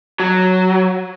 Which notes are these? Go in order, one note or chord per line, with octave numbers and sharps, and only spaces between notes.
F#3